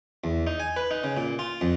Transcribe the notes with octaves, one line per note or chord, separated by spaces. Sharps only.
E2
D#4
G#5
B4
D#4
C#3
A#2
F4
F2